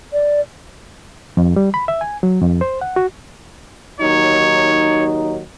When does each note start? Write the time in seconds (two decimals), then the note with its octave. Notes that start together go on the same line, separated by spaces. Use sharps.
0.13 D5
1.37 F2
1.56 G3
1.74 B5
1.88 E5
2.01 G#5
2.23 F#3
2.42 F2
2.61 C5
2.81 F#5
2.96 F#4
4.00 D#2 F#3 D#4 C#5